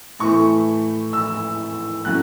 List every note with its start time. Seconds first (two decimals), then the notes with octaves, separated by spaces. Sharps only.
0.19 A2 E3 A3 C#6
1.13 E6
2.04 A2 F#3 A3 C#4 F#6